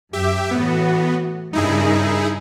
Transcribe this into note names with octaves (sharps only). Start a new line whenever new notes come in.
F#2 G4 E5
A2 E3 B3 F#4
G2 C#3 D#4 E4 G#4 A#4